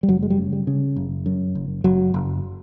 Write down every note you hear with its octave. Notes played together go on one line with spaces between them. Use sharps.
G3
F#1 F#3
G#3
G3
C#3
G3
C#3
F#1
F#2
F#1
F#1 F#3
F#1